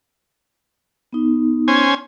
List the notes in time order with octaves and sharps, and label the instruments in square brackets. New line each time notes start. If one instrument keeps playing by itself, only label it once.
[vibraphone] B3 D#4
[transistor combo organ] C#4 C5 G#5